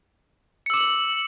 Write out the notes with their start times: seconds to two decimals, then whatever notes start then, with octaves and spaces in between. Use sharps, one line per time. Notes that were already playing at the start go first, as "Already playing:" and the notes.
0.66 C#7
0.70 E6
0.74 D6
0.77 F#7